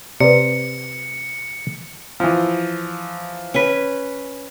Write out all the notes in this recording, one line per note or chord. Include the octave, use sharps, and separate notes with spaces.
C3 B4 D5 C#7
E3 F3
C#4 B4